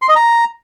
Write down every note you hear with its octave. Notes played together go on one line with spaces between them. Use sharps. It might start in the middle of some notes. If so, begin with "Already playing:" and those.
C6
D#5
A#5